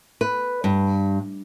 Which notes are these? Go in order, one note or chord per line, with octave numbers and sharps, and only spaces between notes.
B4
G2